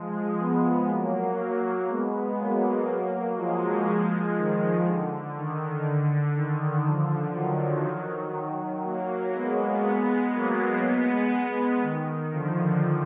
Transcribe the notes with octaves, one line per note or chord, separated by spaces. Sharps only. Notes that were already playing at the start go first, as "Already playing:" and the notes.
Already playing: F3 G#3
G#3 B3
F#3 A#3
F#3 A#3
G#3 B3
F#3 A#3
F3 G#3
D#3
D3
D#3
D3
D#3
D3 F3
D#3 F#3
F#3 A#3
G#3 B3
G#3 B3
F#3 A#3
G#3 B3
D#3
D3 F3